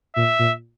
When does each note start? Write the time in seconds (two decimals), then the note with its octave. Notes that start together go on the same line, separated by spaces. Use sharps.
0.15 A#2 E5
0.39 A#2